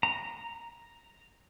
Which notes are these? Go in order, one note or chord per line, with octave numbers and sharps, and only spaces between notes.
A#5